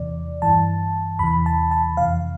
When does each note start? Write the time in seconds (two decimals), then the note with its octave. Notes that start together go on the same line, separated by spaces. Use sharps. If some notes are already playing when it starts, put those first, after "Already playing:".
Already playing: E2 C3 E3 D5
0.42 G2 E3 A5
1.19 E2 C3 E3 B5
1.46 A5
1.71 A5
1.97 F2 C3 E3 F5